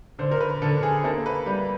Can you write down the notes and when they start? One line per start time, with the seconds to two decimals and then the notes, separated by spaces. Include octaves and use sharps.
0.19 D3 C5
0.31 A#4
0.40 B4
0.62 D3 A4
0.83 G#4
1.04 A#3 A4
1.26 B4
1.46 G3 B4